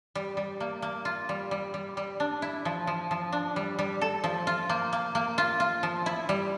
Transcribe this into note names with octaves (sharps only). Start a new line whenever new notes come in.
G3
G3
A#3
A#3
F4
G3
G3
G3
G3
D4
E4
F3
F3
F3
D4
G3
G3
A4
F3
F4
A#3
A#3
A#3
F4
F4
F3
E4
G3